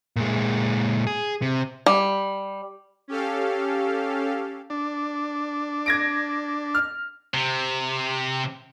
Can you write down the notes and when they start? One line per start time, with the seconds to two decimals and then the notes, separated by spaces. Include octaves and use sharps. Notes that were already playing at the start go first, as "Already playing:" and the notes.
0.16 A#2 G#3
1.07 G#4
1.42 C3
1.86 G3
3.08 C#4 G4 A4 F5
4.70 D4
5.86 G#6 A#6 D7
6.75 F6
7.34 C3